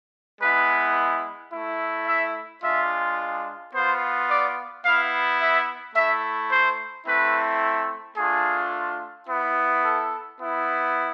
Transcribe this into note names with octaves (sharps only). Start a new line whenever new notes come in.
G#3 B3 E4 B4
A3 E4
E5
G#3 D4 F4 E5
B3 F4 C5
D5
B3 E4 F5
E5
A3 E4 E5
C5
A3 C4 E4 B4
A3 D4 F4 G#4
B3 E4
A4
B3 E4